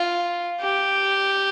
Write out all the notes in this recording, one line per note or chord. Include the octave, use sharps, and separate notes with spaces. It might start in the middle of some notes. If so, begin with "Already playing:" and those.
Already playing: F4
G4